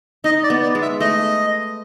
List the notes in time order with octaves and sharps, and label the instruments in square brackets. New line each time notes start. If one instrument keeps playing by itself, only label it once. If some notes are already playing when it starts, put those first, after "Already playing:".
[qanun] D#4 [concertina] D#5
[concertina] D5
[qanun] B3
[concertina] D5
[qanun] G#3
[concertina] E5
[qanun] A3 [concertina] D#5